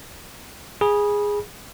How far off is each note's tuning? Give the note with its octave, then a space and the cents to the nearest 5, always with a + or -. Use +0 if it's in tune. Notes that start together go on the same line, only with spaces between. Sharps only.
G#4 -10 B5 -25